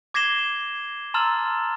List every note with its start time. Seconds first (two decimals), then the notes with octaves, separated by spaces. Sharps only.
0.14 D6 G#6 A#6 C7 E7 G7
1.14 A5 A#5 C6 E6 F6 A6